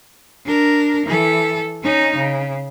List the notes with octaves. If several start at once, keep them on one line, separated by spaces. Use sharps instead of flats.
D4 A#4
E3 A4
C#4 D#4
C#3